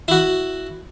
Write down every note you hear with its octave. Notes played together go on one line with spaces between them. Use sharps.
E4 F#4